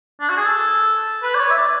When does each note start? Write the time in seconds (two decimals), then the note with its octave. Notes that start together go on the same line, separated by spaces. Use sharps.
0.21 D4
0.29 F#4
0.37 G#4
0.46 A4
1.23 B4
1.35 D5
1.40 C#5
1.50 E5
1.57 D5